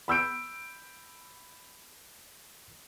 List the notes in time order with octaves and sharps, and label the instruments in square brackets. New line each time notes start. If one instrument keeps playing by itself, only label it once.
[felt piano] B5 E6 G6 D7